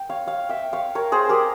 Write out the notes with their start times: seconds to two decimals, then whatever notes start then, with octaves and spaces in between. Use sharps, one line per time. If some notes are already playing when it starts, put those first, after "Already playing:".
Already playing: G5
0.09 C#5 F5
0.27 C#5 F5
0.49 E5 G5
0.73 C#5 F5
0.95 A#4 C#5
1.12 G#4 C5
1.29 G4 A#4